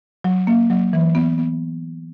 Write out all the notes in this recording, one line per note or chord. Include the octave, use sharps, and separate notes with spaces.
F#3
A#3
F#3
E3
B3
B3